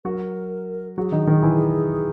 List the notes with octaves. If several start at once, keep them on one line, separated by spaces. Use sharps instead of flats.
F#3 F#4 A#4
F#3 F#4 G#4
D#3 D#4
D#3 D#4
E3 E4